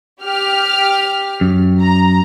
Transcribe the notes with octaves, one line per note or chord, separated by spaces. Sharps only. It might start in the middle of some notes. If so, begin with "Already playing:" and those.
G4 F6
F#2
A#5